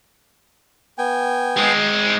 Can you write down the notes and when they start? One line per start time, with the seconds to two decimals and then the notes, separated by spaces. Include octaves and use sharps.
0.98 B3 G5 G#5
1.57 G#3 C4